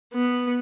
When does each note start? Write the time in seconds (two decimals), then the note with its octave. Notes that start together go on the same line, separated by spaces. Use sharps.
0.14 B3